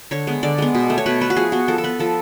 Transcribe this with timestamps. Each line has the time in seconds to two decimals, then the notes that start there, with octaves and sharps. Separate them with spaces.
0.11 D3 C#5
0.27 G#3 B3
0.43 D3 D5
0.58 G#3 B3
0.75 B2
0.90 A3
0.98 C#5
1.06 B2 B4
1.21 A3 B4
1.30 F#4
1.36 F3 G#4
1.52 B3 F#4
1.68 F3 A4
1.78 A4
1.84 B3 B4
1.99 F3 A4